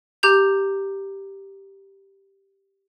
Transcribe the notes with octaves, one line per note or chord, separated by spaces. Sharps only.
G4 A#5 G6 F7